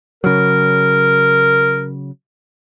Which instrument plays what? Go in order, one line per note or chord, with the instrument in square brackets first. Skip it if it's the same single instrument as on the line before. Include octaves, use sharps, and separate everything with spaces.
[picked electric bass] C#3 F#3 [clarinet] A#4